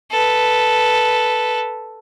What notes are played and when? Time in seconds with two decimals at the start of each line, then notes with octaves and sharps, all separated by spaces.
0.11 A4 B4